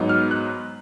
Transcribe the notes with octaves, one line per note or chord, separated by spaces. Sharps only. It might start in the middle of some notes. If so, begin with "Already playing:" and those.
Already playing: G#2 F#3 B3 D#4
F6
F#6